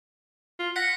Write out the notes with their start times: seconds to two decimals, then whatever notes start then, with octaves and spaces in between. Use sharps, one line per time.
0.59 F4
0.76 F#5 A#6 B6 C#7